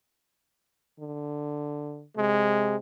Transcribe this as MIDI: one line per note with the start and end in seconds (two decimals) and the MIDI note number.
1.00 2.04 50
2.17 2.77 48
2.17 2.77 56